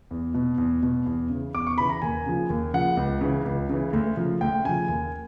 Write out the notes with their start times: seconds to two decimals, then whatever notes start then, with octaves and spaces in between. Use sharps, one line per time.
0.11 E2
0.34 B2
0.58 E2
0.83 B2
1.06 E2
1.30 C#3 E3
1.54 E2 D6
1.67 C#6
1.78 C#3 E3 B5
1.90 A#5
2.02 D#2 G#5
2.26 C#3 F3
2.50 D#2
2.74 C#3 F3 F#5
2.97 C#2
3.21 C#3 E3
3.45 C#2
3.70 C#3 E3
3.93 D2
4.17 C#3 F3
4.41 D2 G5
4.64 C#3 F3 G#5
4.88 D#2 G#5